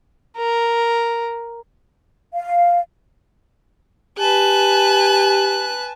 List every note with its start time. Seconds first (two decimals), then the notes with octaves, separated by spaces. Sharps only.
0.37 A#4
2.33 F5
4.19 G4 B4 G#5 A5 F#6